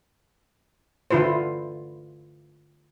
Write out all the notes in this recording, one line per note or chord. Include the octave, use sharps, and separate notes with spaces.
D3 E4 F4 B4 C5